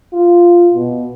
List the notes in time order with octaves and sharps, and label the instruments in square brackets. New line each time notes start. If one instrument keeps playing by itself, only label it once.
[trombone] F4
B2